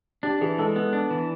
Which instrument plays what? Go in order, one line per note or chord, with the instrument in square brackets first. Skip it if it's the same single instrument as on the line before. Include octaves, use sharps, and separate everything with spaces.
[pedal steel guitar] D4 [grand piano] G4
[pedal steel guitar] E3 [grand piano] G#4
[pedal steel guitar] G#3 [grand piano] A4
[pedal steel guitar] B3 [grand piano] A4
[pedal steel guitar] D4
E3